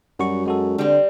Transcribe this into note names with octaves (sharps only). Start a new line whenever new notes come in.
F#2 G3 F#4 C#6
G#3 F#4 A4
D3 G3 C4